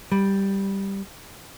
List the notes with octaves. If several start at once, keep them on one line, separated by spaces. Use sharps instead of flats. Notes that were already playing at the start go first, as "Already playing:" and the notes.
G3